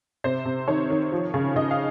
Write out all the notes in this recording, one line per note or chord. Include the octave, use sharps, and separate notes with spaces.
C3 C5
C3
D#3 C#5
D#3
F3
C#3
C#3 D#5
F5